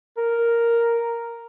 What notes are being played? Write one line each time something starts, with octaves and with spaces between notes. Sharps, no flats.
A#4